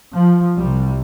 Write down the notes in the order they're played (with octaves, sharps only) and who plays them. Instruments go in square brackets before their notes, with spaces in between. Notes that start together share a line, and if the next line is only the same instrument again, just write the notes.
[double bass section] F3
C2 C3 G3